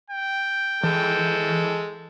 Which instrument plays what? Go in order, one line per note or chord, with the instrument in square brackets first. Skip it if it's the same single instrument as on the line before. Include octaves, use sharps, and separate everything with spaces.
[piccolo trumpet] G5
[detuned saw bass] E3 [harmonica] G#3 A4